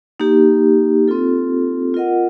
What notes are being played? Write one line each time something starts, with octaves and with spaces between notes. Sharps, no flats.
A#3 D#4 G4
C4 F4 A4
F4 A#4 D#5 F#5